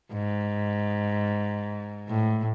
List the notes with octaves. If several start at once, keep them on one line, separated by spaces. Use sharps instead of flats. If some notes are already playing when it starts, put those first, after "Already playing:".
G#2
A2